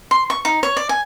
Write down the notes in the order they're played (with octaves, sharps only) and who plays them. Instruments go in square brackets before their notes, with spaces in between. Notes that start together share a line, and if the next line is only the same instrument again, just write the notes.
[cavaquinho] C6
C#6
D#4
C#5
D5
G#5